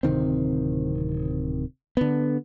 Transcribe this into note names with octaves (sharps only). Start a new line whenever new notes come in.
D1 C3 D#3 C4
D3 B3